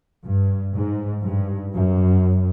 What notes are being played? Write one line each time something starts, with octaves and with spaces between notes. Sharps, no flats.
G2
G#2
G2
F#2